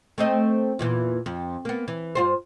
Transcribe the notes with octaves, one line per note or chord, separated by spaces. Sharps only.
A3 C4 D#5
E2 A#2 E3
F2
A#3 B3
E3
G2 F4 C5